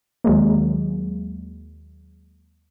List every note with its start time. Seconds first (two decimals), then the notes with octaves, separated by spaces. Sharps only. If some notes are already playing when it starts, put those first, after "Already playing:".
0.24 D#2 F#3 G#3 A#3